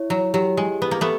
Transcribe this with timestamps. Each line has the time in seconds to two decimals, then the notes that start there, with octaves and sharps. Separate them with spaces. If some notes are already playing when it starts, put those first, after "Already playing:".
Already playing: E4 C#5
0.10 F#3
0.34 F#3 G4
0.57 G#3
0.82 B3 B4
0.91 A#3
1.01 A3 B3